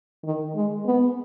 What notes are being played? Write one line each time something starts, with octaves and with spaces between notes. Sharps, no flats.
D#3
G#3
B3